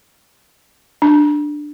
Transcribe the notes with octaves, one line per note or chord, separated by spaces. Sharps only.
D4